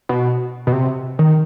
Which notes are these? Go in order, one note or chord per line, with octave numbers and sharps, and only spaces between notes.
B2
B2
C3
D#3